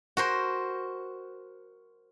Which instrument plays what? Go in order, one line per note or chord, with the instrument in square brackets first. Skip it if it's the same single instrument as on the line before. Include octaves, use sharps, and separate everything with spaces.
[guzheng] F#4 A#4 C5